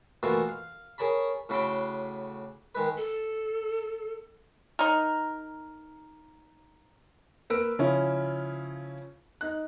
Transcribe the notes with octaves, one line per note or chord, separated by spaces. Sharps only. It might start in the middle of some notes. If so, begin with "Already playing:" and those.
B2 E3 A3 A#3 F4 F#4
F5
G#4 A#4 C#5 A5 B5
A2 C#3 F#4 B5 C6 D6
D#3 G#3 B4
A4
D#4 A#4
A#3 A#4 B4 E6 D7
C#3 F3 C#4 E4
D#4 F#6